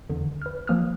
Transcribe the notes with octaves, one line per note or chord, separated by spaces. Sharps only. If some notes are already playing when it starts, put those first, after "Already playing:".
E2 D3
B4 F6
F3 A#3 D#6 F6